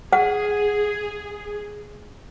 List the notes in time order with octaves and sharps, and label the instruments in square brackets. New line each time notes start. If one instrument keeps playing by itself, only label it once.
[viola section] G#4 [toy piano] F#5